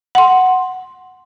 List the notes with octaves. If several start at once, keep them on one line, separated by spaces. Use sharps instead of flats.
F#5 C6